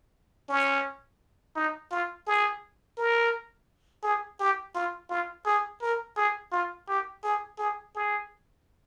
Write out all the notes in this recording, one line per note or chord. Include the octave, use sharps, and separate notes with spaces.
C#4
D#4
F4
G#4
A#4
G#4
G4
F4
F4
G#4
A#4
G#4
F4
G4
G#4
G#4
G#4